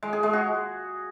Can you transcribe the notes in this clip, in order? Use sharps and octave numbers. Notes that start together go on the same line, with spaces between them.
G#3
G#4
G#3
F#4